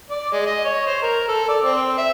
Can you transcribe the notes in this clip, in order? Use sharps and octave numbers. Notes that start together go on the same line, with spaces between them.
D5
G#3
D#5
C#5
C5
A#4
A4
D5
C4
E5